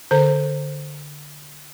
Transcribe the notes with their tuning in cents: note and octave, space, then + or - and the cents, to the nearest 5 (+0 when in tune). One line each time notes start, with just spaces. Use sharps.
D3 +0 A4 +0 C5 +0